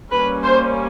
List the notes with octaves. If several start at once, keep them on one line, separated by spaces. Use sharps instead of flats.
G3 A#3 C#4 B4
C5